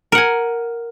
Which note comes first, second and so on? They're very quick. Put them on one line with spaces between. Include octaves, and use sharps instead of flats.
A#4 F#5 G#5